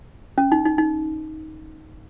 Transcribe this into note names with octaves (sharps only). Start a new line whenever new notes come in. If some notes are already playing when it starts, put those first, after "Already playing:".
C#4
D#4
D#4
D#4